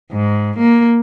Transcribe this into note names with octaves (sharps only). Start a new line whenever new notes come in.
G#2
A#3